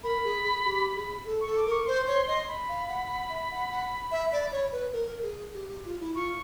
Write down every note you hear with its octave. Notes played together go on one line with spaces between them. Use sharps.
A#4 B5
G#4
G#4
G4
G#4
A4
C#6
A4
D6
A#4
C#6
C5 C6
C#5
D#5
B5
F5
F#5
F#5
E5
F#5
F#5
E5
D5
C#5
B4
A#4
G#4
G4
G4
F4
E4
F4 C#6